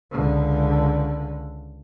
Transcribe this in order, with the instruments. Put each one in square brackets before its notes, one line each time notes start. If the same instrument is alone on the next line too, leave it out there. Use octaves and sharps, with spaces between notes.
[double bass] C#2 D3